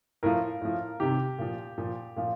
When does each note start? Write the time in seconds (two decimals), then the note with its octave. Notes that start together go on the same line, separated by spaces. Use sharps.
0.23 A2 F3 A#4
0.61 A2 F3
1.00 C3 D#3 G4
1.39 A#2 F3
1.78 A#2 F3
2.17 A#2 F3